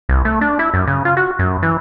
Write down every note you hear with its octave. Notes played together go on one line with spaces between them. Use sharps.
C2
A3
D4
E4
F#2
C#3
F4
F#4
F#2
E3